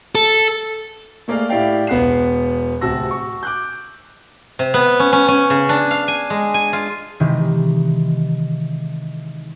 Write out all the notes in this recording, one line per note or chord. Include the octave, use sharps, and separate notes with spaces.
A4
A3 A#3 G#4 D5 F5 F6
A2 E4 G4 D5 F5 G5
E1 B3 F#5 F#6 C7 E7
D1 C3 F#4 A5 E6 A#6
F#4 C#6
D6 F#6 G6
C3
B3
C#4
C#4
C#4
C#3
D4
F5
G#5
G#3
G#5
F4
C3 D#3 E3 G#3